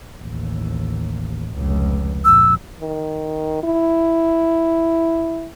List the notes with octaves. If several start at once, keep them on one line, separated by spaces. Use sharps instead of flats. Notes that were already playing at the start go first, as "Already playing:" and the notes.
A1 D#2
F1 C#2
F2 A#2 E6
D#3
E4